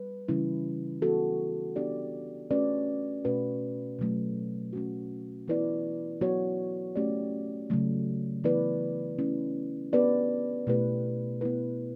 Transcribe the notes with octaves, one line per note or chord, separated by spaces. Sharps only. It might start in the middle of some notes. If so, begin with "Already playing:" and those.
Already playing: G3 B4
C#3 E3 G3 C#4 E4
E3 B3 F#4 A4
B3 D4 G4 D5
A3 C#4 F#4 B4 D5
B2 A3 C#4 F#4 B4
B2 F#3 A3
A3 C#4 F#4
E3 B3 E4 B4 D5
F#3 B3 F#4 C#5
A3 C#4 G4 D5
C#3 F#3 A3
E3 B3 E4 B4 D5
A3 C#4 E4
B3 D4 G4 B4 D5
B2 A3 E4 G4 B4
B3 E4 B4